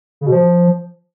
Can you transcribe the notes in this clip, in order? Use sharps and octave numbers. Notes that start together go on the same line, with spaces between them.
C#3
B2
F3